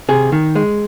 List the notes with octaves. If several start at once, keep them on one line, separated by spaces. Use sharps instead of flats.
C3 G#4
D#3
G#3